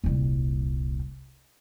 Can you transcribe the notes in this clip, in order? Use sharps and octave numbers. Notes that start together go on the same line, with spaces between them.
D#1 C2